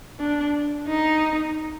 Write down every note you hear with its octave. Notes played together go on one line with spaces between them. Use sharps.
D4
D#4